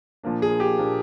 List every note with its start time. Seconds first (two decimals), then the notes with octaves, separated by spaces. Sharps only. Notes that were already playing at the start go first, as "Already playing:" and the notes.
0.23 A#2 F3 A#3 D4
0.42 G#4
0.60 G4
0.77 A#2 F3 A#3 D4